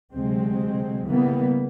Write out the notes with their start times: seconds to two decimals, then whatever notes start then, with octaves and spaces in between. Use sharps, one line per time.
0.12 D2 C3 F#3 G#3 C4
1.07 C#3 E3 G3 A#3 B3